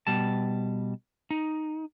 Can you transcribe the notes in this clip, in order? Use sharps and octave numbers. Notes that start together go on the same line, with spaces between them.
B2 G3 A5
D#4